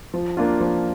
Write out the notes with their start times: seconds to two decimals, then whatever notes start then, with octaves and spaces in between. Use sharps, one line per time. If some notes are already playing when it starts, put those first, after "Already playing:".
0.14 F3
0.37 A#3 D4 F4
0.60 F3